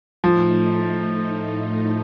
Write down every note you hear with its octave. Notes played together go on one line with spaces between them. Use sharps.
A2 F3 A3 D#4